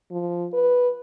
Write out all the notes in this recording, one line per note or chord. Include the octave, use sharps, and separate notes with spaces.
F3
B4